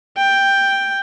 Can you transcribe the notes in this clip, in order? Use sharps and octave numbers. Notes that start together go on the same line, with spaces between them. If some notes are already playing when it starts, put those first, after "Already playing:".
G5